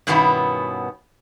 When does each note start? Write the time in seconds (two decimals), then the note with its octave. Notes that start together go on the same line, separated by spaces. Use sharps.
0.07 G2 B2 D#3 B3 C#4 E4